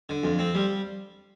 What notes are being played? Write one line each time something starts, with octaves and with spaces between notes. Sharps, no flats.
D3
F2
C4
G3